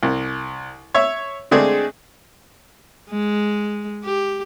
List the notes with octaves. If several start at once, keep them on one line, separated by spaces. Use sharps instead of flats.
C2
C#5 E5
D3 G#3 A3 C4 D4 G#4
G#3
G4